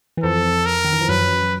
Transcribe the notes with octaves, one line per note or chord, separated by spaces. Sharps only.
E3
F2 F3 A4
A#4
D#3
E3
F3
F#2 F#3 B4